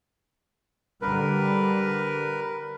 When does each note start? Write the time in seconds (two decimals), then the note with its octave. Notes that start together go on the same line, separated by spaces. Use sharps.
1.02 D3 G3 A#4 B4